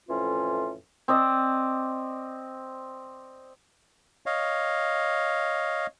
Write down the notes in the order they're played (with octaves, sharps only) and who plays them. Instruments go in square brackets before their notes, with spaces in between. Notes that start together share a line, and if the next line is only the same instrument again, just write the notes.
[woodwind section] F2 A2 E3 C#4 F4
[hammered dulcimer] C4 D5 D#5
[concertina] C#5 D#5 F5